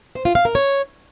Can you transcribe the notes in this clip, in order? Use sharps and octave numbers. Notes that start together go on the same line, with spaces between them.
C5
F4
F5
A#4
C#5